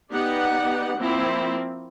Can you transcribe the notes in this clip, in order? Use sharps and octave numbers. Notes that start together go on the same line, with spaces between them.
B3 D#4 G4 D5 F#5
F3 A#3 C4 E4